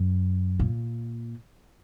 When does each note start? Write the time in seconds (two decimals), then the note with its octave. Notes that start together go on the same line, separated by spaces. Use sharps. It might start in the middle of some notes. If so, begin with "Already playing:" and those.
Already playing: F#2
0.60 A#2